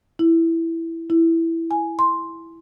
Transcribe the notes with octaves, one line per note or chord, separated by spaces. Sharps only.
E4
E4
G#5
C6